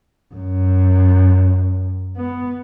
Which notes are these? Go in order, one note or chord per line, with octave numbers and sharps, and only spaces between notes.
F#2
B3